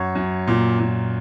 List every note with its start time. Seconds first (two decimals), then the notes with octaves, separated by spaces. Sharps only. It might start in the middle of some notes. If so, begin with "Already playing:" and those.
Already playing: F#2 C#5
0.15 F#2
0.47 A#2
0.79 A#2